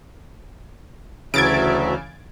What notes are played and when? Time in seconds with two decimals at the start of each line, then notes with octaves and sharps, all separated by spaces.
1.34 D2 C#3 E3 F#3 E5 G#6 A6 D7